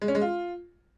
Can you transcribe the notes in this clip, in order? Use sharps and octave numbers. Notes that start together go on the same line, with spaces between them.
G#3
C#4
G#3
F4